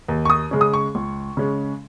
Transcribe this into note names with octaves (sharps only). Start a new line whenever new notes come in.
D#2
C#6
D#6
C#3 G#3 C#4
D#6
C#6
C#2
C#3 G#3 C#4